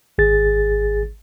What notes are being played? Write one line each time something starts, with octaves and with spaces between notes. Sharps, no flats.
G#1 G#4 A6